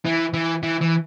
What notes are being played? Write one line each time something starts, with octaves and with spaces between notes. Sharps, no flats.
E3
E3
E3
E3